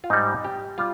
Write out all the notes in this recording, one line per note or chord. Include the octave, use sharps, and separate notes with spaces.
F4
G#2 G3 D#4
G4
G3 F4